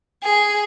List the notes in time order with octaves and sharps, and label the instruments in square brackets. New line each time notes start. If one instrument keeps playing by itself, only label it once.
[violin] G#4